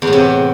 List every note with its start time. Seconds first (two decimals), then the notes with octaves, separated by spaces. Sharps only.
0.02 E2
0.07 A2
0.13 C3